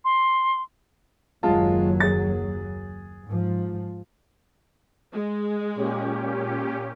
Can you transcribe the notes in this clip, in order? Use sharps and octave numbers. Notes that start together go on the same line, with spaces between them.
C6
F#1 D#2 F#3 G#3 F4 A5
G#4 A6
G#2 F3
G#3
A#2 C#4 G4